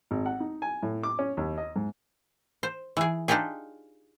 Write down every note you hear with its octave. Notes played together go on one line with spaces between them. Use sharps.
G#1
F#5
D#4
G#5
A2
D6
C#4
D#2
D#5
G#2
C5
E3 G#4
D4 D#4 F4 G4 G#4